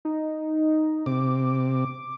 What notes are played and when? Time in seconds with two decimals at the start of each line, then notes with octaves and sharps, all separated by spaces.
0.05 D#4
1.06 C3 D6